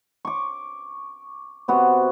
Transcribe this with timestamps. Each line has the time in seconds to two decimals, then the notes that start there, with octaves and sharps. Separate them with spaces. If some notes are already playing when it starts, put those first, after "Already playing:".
0.25 C#6 D6
1.68 C3 B3 F#4